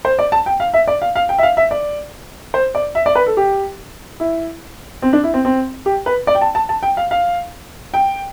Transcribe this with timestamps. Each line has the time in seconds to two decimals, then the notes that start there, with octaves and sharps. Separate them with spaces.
0.05 C5
0.19 D5
0.32 A5
0.46 G5
0.60 F5
0.74 E5
0.87 D5
1.02 F5
1.15 F5
1.29 G5
1.38 E5
1.43 F5
1.57 E5
1.71 D5
2.54 C5
2.75 D5
2.95 E5
3.06 D5
3.15 B4
3.27 A4
3.37 G4
4.20 E4
5.02 C4
5.13 D4
5.24 E4
5.34 C4
5.45 C4
5.86 G4
6.06 B4
6.27 D5
6.35 G5
6.41 A5
6.55 A5
6.69 A5
6.83 G5
6.97 F5
7.11 F5
7.94 G5